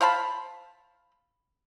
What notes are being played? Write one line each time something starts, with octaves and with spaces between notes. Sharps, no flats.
C5 F5 A5 B5